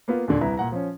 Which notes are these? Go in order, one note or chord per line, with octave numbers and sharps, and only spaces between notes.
A#3 B3 F4
D#2 A#2 D3 D5
C2 E4 B4 A#5
A#2 F#5 A#5
F3 C#4